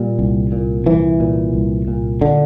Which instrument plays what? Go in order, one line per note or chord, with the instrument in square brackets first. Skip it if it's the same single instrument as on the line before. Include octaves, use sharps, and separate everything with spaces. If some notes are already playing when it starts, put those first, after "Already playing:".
Already playing: [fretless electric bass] A#2 G3
C2
A#2
C2 E3
A#2
C2
A#2
D3